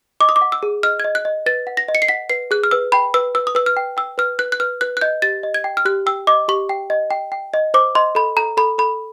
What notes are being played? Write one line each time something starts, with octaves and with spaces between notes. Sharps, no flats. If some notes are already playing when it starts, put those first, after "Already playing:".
D#5 D6
D#6
D6
F#5
E6
G#4
D#5 F6
G#6
D#5
F#6
D#5
B4 A6
F#5
A#6
D#5
C#7
C7
F#5 B6
B4 C7
G#4 F#6
F6
B4 E6
G5 B5
B4 E6
B4 E6
D#6
B4 E6
F6
G5
G5 E6
B4 F6
B4 F#6
F#6
B4 F6
B4 F#6
F#6
D#5 G6
G4 A6
D#5
G#6
G5
F6
G4 F#6
G5 E6
D#5 D6
G4 C#6
G5
D#5
G5
G5
D#5
C5 D6
D#5 C6
A4 B5
A4 A#5
A4 B5
A4 B5